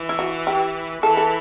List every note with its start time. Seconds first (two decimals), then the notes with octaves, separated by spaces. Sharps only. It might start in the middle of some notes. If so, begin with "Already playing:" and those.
Already playing: E3
0.09 E4
0.19 F#4
0.47 G4
1.03 E3 A4
1.17 A4